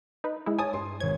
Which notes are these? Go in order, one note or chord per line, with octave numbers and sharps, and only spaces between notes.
D#4 B4
G#3 E4
C#5 G#5 A5 D#6
G2 C6
G#1 C#5 G#6